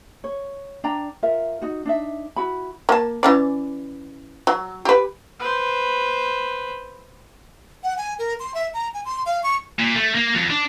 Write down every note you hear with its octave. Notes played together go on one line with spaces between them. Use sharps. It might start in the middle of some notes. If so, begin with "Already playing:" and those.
C#5
D4 D5 G5 A#5
F4 A#4 E5
D#4 F#4
D4 D#4 E5
E4 F#4 B5
A#3 A5
E3 C#4 D5
F#3
G4 B4
B4 C5
F#5
G#5
A#4
C6
E5
A#5
G#5
C6
F5
C#6
A#2
A3
A#3
F2
D4